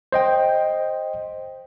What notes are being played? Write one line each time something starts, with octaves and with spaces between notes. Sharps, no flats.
C5 D#5 G5